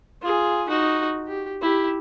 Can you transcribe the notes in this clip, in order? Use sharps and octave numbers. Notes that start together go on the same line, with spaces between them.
F4 G#4
D#4 F#4
G4
E4 G4